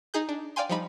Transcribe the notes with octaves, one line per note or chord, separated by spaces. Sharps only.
D#4 G#4 G6
D4
D5 F5 G5 G#5 C6
F3 G3 D#4 B5